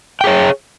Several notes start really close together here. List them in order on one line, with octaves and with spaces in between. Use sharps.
G5 G#4 C#5